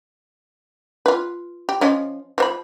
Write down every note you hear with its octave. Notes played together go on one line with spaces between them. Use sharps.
F4 B4
G4
F3 C#4 D#5
F3 C5 B5